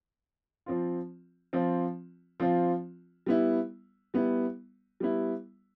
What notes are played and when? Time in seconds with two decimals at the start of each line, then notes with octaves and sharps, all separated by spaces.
0.66 F3 C4 F4
1.53 F3 C4 F4
2.40 F3 C4 F4
3.26 G3 B3 E4
4.14 G3 B3 E4
5.00 G3 B3 E4